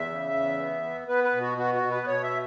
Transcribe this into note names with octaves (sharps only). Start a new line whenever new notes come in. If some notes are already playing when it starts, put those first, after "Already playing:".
Already playing: E2 E5
C#3
E2
B3
B3
B3 B4
B4
B2
F#4
B3 F#4
F#4
B2
B4
B2 C#5
E5